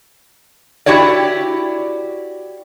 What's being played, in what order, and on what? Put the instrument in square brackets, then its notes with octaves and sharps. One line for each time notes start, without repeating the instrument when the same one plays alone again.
[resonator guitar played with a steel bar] E4 F#4 G4 C#5 D5